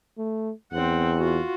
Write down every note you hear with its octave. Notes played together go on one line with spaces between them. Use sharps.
A3
E2 C4 F#5
F4 F#4